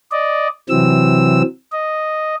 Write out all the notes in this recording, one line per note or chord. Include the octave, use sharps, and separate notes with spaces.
D5 D#5
C3 E3 F#3 C4 E6
D#5